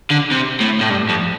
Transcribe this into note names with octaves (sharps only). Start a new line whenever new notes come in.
D3
C3
A2
A2
G2
F2